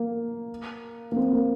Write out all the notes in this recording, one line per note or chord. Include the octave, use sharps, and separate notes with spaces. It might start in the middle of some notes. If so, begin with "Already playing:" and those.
Already playing: A#3
A#3
C4
A#3